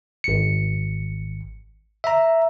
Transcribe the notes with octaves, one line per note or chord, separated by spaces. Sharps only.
G#1 C#7
E5 A#5